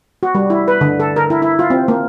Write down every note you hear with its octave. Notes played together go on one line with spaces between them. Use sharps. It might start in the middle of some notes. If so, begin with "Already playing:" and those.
F#4
G3
E4
B4
D3
A4
A#4
E4
E4
F4
C4
A#3